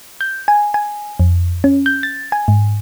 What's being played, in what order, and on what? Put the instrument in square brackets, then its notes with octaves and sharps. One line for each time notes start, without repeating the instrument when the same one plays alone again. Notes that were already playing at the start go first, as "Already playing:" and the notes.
[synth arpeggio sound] G6
G#5
G#5
F2
C#4
G6
A6
G#5
G#2